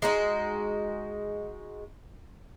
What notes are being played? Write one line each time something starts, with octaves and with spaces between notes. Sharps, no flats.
G#3 D#4 F#4